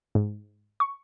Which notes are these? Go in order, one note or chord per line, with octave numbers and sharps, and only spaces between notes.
G#2
C#6